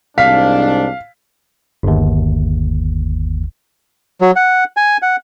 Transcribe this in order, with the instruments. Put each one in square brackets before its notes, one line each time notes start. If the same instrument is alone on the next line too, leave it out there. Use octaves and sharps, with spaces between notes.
[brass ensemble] C2 G#2 D4 [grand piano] F5 B6
[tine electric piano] G1 D#2
[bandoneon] F#3
F#5
G#5
F#5